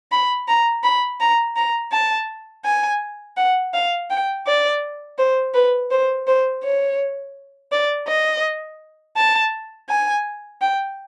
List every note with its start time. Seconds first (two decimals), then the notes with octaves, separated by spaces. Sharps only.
0.12 B5
0.48 A#5
0.84 B5
1.20 A#5
1.56 A#5
1.92 A5
2.65 G#5
3.37 F#5
3.74 F5
4.10 G5
4.46 D5
5.18 C5
5.54 B4
5.91 C5
6.27 C5
6.63 C#5
7.72 D5
8.08 D#5
9.17 A5
9.89 G#5
10.61 G5